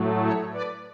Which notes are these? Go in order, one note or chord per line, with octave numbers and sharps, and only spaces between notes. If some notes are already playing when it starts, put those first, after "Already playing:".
Already playing: A2 F#3 A3
A4 C#5
B4 D5